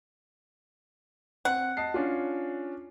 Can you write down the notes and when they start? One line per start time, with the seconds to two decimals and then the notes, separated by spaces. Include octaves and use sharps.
1.45 C4 F#5
1.77 D#5 A5 C7
1.94 C#4 D4 F4